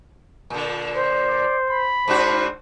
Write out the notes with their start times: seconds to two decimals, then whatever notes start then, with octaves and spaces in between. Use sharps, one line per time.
0.50 A#2 D3
0.95 C5
1.29 D5
1.70 B5
2.08 G#2 D4 F#4 C5